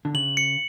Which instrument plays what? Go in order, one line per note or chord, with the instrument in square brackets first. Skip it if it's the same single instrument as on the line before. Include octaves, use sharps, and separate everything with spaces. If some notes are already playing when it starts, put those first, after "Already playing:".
[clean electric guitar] D3
[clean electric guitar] C#3 [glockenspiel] F#7
[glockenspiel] C#7